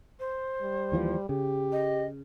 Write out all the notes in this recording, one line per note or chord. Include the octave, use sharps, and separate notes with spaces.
C5
G3
D#2 E3 F3
C#3 G4
D#5